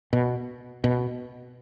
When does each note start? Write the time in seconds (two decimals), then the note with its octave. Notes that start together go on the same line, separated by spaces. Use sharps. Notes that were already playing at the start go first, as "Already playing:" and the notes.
0.13 B2
0.84 B2